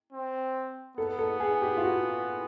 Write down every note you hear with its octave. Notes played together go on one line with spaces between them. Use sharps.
C4
B3 A4
A4
G#4
G4
F4
F#4